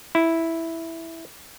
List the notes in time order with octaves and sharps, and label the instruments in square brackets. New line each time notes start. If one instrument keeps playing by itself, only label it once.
[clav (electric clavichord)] E4